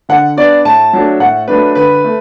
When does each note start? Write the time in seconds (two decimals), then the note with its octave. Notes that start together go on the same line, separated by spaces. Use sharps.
0.09 D3 F#5
0.36 B3 D4 D5
0.65 A2 A5
0.93 F#3 A3 D4
1.20 A2 F#5
1.48 F#3 A3 D4 B4
1.75 D3 B4
2.04 A3